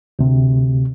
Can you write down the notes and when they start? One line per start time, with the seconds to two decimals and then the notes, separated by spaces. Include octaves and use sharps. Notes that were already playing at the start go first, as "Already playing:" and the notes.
0.19 D2 C3